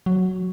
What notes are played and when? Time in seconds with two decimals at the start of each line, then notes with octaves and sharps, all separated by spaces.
0.06 F#3